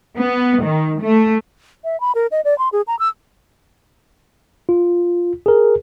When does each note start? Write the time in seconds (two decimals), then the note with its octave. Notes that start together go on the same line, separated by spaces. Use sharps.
0.18 B3
0.63 D#3
1.01 A3
1.84 E5
2.01 B5
2.15 A#4
2.31 D#5
2.45 D5
2.58 C6
2.72 G#4
2.87 A#5
2.99 E6
4.69 F4
5.46 G#4 A#4